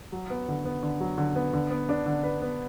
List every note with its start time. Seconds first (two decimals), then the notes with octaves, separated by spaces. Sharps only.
0.12 F#3
0.30 B3
0.48 D3
0.66 B3
0.83 D3
1.00 F#3
1.18 D3
1.36 B3
1.53 D3
1.71 B3
1.89 D4
2.06 D3
2.24 B4
2.42 B3